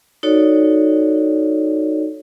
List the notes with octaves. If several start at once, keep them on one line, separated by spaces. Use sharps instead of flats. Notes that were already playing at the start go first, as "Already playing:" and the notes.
D#4 F#4 A4 C#5 D5